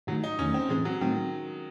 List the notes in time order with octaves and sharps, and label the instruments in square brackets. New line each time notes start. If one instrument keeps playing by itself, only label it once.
[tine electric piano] G#2 D#3 A3 D#4 [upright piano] F#3
[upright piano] D#4
[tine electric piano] E2 D#3 A3 [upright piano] C#4
[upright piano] C4
[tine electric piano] A2 E3 C4 [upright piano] G#3
[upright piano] F#3
[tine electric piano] A2 F#3 A3 C4 [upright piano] D#3